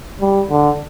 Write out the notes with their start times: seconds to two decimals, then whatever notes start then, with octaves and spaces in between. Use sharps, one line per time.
0.21 G3
0.50 D3